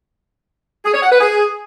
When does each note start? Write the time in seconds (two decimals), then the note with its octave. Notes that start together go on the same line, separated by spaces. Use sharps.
0.85 G#4
0.94 C#5
1.03 F#5
1.12 B4
1.21 G#4